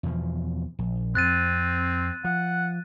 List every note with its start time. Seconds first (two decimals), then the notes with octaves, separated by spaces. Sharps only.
0.03 E2 B2 F3
0.79 A#1
1.15 F2 C4 F#6 A6 D#7
2.25 F3 F#5